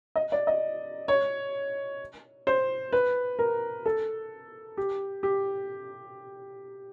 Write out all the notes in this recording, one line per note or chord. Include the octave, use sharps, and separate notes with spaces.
D#5
D5
D#5
C#5
C5
B4
A#4
A4
G4
G4